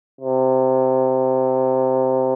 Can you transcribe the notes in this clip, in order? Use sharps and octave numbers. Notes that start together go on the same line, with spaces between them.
C3